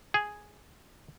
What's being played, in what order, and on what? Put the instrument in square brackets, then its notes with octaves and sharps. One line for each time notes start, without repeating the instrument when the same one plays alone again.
[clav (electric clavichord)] G#4